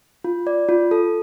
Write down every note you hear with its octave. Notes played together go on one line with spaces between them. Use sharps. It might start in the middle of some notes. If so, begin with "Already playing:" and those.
F4
D5
F4
A4